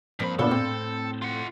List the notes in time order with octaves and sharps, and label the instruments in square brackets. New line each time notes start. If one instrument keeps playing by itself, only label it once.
[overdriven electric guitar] G2 B5 [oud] F3 A#3 C4
[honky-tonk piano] A#2 B3 D4 [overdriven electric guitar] A4 [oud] C#5
[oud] A2 [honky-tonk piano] C4
[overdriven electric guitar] F4 F#5